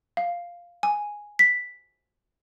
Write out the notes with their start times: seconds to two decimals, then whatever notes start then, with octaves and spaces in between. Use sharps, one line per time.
0.17 F5
0.83 G#5
1.39 B6